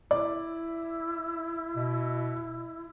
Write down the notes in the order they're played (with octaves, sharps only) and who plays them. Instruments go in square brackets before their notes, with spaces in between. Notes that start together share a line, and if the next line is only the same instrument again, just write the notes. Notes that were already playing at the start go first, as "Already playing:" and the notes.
[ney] E4 [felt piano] D5
[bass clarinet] B2